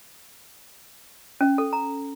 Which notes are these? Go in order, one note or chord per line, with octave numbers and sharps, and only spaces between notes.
C#4
A4
A#5